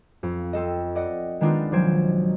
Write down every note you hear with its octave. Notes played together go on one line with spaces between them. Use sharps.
F2
C4 A4 D#5
D5 D#5 F#5
D#3 G#3 B3 D4 D#4 F4
B1 F3 F#3 C5 G#6 D7